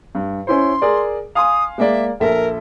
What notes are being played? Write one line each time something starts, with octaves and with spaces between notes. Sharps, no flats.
G2
C#4 E4 C5 C6
G#4 A#4 D5
F5 G#5 C6 D#6
G#3 A#3 D5 E5
A#1 A4 A#4 E5